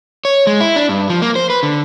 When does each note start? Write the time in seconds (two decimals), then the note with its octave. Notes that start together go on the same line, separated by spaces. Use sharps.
0.25 C#5
0.47 G#3
0.61 E4
0.76 D4
0.89 G2
1.09 F3
1.22 A#3
1.36 C5
1.50 B4
1.63 D3